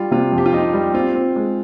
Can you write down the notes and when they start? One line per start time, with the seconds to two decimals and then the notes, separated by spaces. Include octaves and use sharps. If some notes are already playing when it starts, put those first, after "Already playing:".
Already playing: G3 F4
0.11 C3 F4
0.32 F2
0.38 G4
0.46 F4
0.53 F2 D#4
0.73 G3
0.94 C4 F4
1.15 C4
1.36 G#3